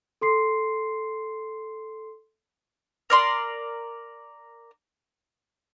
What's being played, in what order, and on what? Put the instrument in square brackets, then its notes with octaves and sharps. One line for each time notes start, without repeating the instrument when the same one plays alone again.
[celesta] A4 C6 C7
[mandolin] A#4 D5 C6